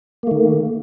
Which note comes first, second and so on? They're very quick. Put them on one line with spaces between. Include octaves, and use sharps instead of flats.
A#3 A3 D#3